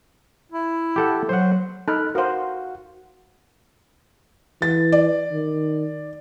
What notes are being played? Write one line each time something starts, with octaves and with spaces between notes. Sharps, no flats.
E4
G4 A4 F#5
F#3 C5 F#5
D#4 A4 B5 F6 F#6
F#4 A#4 C5 F5 F#5
E3 A6
D5
D#3